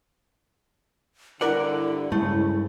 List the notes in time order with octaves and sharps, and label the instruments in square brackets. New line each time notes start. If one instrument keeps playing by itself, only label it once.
[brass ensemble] G2 D3 [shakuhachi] E4 [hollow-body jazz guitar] A#4 D5 F#5
[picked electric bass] G2 G#3 [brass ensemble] C#3 A4 [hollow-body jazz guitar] A3